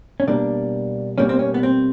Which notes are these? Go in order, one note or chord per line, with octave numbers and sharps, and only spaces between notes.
C#4
B2 G3 A#3 D4
B2 G3 A#3 C#4
C4
C#4
B3
C4